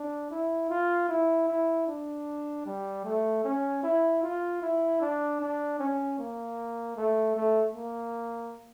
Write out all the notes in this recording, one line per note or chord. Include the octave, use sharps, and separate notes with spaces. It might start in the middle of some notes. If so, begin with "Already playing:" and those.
Already playing: D4
E4
F4
E4
E4
D4
G3
A3
C#4
E4
F4
E4
D4
D4
C#4
A#3
A3
A3
A#3